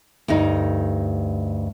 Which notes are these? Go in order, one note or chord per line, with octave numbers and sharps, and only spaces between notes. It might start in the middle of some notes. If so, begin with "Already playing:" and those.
D2 G2 D#4